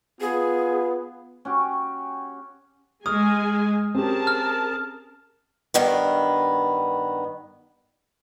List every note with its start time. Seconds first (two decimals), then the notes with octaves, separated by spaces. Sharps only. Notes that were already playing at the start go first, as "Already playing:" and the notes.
0.21 B3 F4 G#4
1.45 C#4 F#4 G4
3.06 G#3 G#5 C#6 D#6 F6
3.95 C4 C#4 G4 G#4 A#4 A5
4.27 F6
5.74 G2 D#3 B3